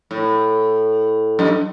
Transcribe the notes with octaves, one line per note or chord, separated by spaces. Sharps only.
A2
F#2